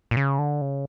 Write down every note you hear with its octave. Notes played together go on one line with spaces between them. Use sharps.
A#2
C#3
D3
C#3